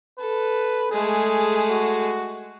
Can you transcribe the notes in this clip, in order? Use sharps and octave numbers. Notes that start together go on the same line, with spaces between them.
A4 B4
G#3 A3 G#4
F#4